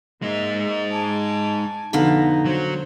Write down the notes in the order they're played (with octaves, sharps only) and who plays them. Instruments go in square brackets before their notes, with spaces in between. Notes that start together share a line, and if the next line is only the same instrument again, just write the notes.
[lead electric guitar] G#3 D#4 [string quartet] A#3 E5
[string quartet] G#5 A5 D6
[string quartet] F2 B2 [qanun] D3 F5 B5 [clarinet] D#4
[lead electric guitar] F#3 [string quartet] C5